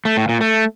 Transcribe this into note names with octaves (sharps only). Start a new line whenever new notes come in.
A3
A2
A#2
A3